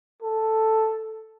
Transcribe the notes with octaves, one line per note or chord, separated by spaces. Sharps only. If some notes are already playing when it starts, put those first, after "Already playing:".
A4